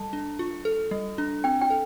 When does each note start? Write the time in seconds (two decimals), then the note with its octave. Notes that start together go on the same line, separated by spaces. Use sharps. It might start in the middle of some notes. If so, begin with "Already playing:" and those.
Already playing: G3 A4 A5
0.13 D4
0.39 F4
0.65 A4
0.91 G3
1.18 D4
1.44 C4 G5
1.61 G5
1.70 A4